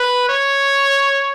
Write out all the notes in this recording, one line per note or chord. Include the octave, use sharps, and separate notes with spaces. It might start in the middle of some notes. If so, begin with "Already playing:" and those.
Already playing: B4
C#5